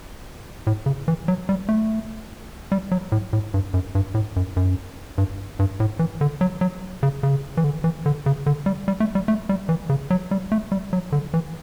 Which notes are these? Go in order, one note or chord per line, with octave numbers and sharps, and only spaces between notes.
A2
C#3
E3
F#3
G3
A3
G3
F#3
A2
A2
G2
F#2
G2
A2
F#2
F#2
G2
G2
A2
E3
D3
F#3
F#3
C#3
C#3
E3
D3
E3
D3
C#3
D3
G3
G3
A3
G3
A3
G3
E3
C#3
F#3
G3
A3
G3
F#3
D3
E3